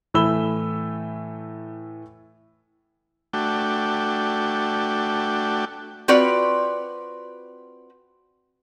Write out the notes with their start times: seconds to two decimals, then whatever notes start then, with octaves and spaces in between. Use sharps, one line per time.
0.14 A2 E3 A3 B5 E6 G7
3.33 A3 D4 F#4 G5
6.08 C4 F4 F#4 B4 D5